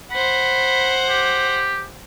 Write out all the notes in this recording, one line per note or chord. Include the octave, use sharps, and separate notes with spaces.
C5 F#5 B5
G4